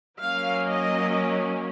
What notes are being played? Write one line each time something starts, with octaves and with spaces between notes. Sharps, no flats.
F#3 A#3 C#4 F5
D#5